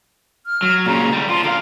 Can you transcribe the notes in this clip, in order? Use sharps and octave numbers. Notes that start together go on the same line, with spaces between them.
F6
F#3
A#2 C#3 A#5
D3 G3
F3 C6
D3 F5 A#5